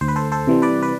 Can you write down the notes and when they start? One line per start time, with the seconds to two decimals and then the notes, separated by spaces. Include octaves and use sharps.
0.01 D2 C5
0.08 B4
0.16 A4 C5
0.32 A4 C5
0.47 C3 E3 G3
0.62 B4 D5
0.83 B4